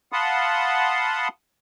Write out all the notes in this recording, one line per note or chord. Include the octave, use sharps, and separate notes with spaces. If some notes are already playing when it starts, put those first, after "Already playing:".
F5 F#5 A5 B5 C6 D#6